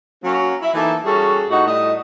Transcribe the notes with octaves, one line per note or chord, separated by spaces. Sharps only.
F#3 A#3 C#4
E4
E3 A3 A#3 D#4 A4
G3 C#4 F#4 G#4 A4
A2 D#4 F#4
A2 G3 D#5